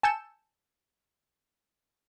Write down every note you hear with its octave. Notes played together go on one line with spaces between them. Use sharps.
G#5 A5 E6 G6 C#7 E7